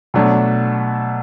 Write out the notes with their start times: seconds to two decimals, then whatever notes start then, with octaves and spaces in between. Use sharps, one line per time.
0.14 B2 F#3 A3 D4